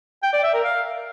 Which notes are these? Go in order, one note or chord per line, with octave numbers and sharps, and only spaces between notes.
G5
D5
E5
A#4
F5